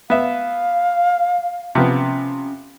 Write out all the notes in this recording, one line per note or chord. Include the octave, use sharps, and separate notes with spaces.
B3 E5 F5
C3 F3 B3 C#4